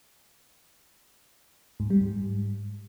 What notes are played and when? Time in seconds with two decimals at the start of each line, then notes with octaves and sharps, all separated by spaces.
1.80 G#2
1.90 G3
2.01 G#2